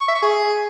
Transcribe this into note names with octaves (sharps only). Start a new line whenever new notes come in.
C#6
E5
C#6
G#4